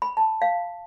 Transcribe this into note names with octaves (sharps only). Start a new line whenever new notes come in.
B5
A5
F5